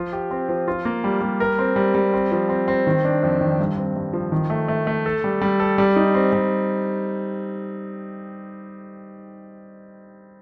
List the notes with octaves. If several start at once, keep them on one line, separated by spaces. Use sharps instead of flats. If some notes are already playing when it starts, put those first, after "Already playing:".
Already playing: F3 F4
G4
C4
F3
F4
A#3
G3
G3
A#4
C4
G3
G3
C4
F3
C4
C4
D#3
D4
F2
D#3
G2
C4
G2
F3
D#3
A3
A3
A3
A4
G3
G3
A4
G3
D#4
C4
G3